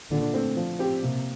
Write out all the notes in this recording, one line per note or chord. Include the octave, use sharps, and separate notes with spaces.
A#2 D3
A3 C4
F3
C4 G4
C3 A#3